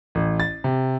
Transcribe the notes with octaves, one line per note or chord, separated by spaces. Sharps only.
A1
A6
C3